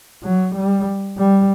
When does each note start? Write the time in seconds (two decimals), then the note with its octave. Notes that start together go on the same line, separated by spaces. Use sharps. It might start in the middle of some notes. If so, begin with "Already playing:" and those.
0.24 F#3
0.55 G3
1.18 G3